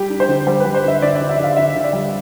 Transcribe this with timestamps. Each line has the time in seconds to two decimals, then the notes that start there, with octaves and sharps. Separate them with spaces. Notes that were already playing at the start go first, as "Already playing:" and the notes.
Already playing: G3 G4
0.10 D4
0.20 C5
0.28 D3
0.47 G3 C5
0.60 G3 B4
0.74 C5
0.84 D3 E5
1.02 D3 D5
1.15 D3 D5
1.29 E5
1.38 D3 F5
1.57 D3 E5
1.75 D3
1.84 D5
1.93 G3